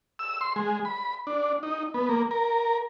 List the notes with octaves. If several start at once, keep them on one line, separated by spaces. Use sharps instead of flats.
E6
C6
G#3
B5
D4
D#4
B3
A#3
A#4